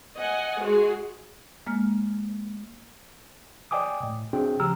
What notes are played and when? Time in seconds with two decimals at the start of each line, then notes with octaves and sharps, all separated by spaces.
0.17 D#5 F#5 G#5
0.61 G#3 F#4 G#4
1.67 G#3 A#3 F6
3.71 D5 D#5 G5 G#5 D6 D#6
4.03 A2
4.33 C4 D4 F#4 G#4 G5
4.60 C#3 F3 G4 A#5 E6 F6